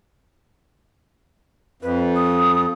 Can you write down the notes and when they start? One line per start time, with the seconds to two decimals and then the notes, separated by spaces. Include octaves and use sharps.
1.82 F2 B4
2.16 D#6